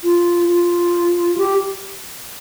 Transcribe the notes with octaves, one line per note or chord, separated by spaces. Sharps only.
F4
F4
G4